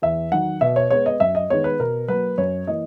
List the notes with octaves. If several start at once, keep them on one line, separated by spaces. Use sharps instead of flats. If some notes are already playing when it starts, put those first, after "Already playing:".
E2 E5
D#3 F#3 F#5
B2 E5
C#5
G#3 B3 C#5
D#5
F#2 E5
D#5
D#3 G#3 B3 C#5
B4
B2 A#4
F#3 A#3 B4
F#2 C#5
E3 A#3 D#5